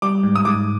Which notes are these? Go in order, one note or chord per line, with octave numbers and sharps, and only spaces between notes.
G3 D6
G#2
D#6
G#2 D6